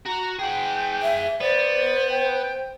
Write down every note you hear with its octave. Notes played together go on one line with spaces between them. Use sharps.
F#4 A#5
G#4 F#5 G5
E5
B3 C5 D5
G5